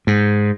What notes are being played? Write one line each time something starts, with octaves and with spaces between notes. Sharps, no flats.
G#2